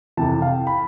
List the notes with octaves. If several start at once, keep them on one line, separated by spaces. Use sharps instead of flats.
F2 C3 E3 A5
F5
G5
B5